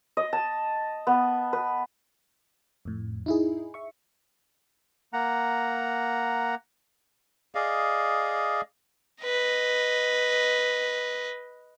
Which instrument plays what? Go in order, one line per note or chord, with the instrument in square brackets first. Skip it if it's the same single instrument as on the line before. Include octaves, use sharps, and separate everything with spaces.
[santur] D#5
A5
B3
B4
[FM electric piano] F2 A2
D#4 E4 G#4
E5 C#6
[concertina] A#3 F#5 A#5
[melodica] G#4 D5 D#5 F5
[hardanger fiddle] B4 D#5